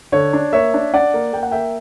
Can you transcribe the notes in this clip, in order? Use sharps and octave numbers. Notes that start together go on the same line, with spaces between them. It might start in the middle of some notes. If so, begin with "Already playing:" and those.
D3 C#5
D4
A#3 C#5 E5
D4
D4 D5 F#5
A#3
A#3 G5
F#5
A#3 E5 G5